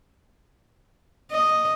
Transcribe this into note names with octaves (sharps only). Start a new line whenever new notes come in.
D#5